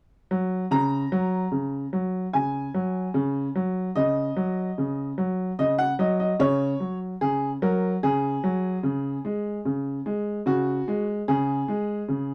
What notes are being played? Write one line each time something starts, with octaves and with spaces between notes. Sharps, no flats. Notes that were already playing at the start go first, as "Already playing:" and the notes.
F#3
C#3 A#5
F#3
C#3
F#3
C#3 G#5
F#3
C#3
F#3
C#3 D#5
F#3
C#3
F#3
C#3 D#5
F#5
F#3 D#5
D#5
C#3 C#5
F#3
C#3 G#4
F#3 A#4
C#3 G#4
F#3
C#3
G#3
C#3
G#3
C#3 F#4
G#3
C#3 G#4
G#3
C#3